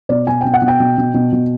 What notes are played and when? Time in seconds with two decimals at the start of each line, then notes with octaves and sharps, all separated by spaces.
0.09 B2 D5
0.27 B2 G#5
0.41 B2 G5
0.54 F#5
0.62 B2
0.68 G5
0.80 B2
0.98 B2
1.14 B2
1.32 B2